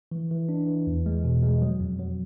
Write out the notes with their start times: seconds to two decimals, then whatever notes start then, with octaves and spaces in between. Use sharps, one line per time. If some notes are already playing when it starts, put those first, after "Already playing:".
0.12 E3
0.31 E3
0.49 D4
0.67 E3
0.87 E2
1.06 G#3
1.24 B2
1.43 G#3
1.62 F#3
1.80 F2
1.99 F#3